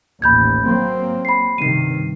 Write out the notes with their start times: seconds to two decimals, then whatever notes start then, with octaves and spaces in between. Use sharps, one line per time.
0.22 A1 D#2 B5 G6 G#6
0.65 F#3 A#3 C4
1.25 B5 C7
1.58 G2 C3 D#3 C7 D#7